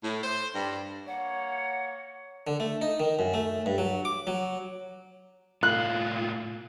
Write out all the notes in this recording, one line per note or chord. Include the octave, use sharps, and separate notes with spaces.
A2
C5
G2
A#3 C#5 F#5
D3
A3
D#4
D#3
F#2
A3
G2
F#3
D6
F#3
A2 F4 F#6